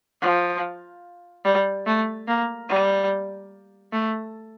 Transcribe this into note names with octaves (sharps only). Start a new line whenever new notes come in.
F3
G3
A3
A#3
G3
A3